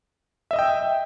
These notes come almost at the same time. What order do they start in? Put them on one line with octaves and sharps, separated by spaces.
E5 D#5 E6 G5